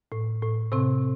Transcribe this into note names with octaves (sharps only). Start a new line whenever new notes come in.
A2
A2
A2 C3 C4